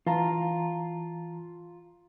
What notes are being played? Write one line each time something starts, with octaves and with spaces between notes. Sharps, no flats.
E3 F4 A5 A#5